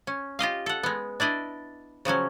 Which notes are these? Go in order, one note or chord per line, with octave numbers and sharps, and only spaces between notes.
C#4
F4 G4 D#5 F5
A4 F#5
G#3 B3
D4 E4 D5 D#5
C#3 F3 F#3 C#4